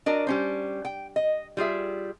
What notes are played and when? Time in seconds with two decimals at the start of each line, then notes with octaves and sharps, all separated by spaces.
0.06 D4 F#4 A#4 D5 D#5
0.27 G3 C#4 C5
0.85 G5
1.16 D#5
1.57 G3 F4 G#4 E5